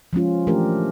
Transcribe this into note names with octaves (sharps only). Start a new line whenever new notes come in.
F3 G#3 C#4 F4
E3 A3 D4 G4 A#4